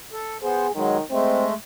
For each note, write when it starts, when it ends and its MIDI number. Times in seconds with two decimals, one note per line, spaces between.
0.12 0.37 69
0.43 0.67 59
0.43 0.74 68
0.43 0.67 72
0.75 1.02 51
0.75 0.97 54
0.75 0.97 56
1.11 1.54 56
1.11 1.54 57
1.11 1.45 60